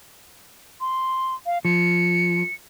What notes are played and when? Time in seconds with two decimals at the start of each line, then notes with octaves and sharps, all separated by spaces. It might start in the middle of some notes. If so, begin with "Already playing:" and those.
0.81 C6
1.46 F5
1.65 F3 C#7